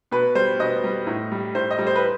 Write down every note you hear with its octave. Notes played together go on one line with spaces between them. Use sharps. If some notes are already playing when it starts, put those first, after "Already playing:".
B2 B4
G3 C5
B2 D#5
G3
A2
G3
A2 C5
D#5
G3
C5
B4